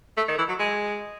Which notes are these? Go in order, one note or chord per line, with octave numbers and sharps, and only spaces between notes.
A3
D#3
E3
F#3
G#3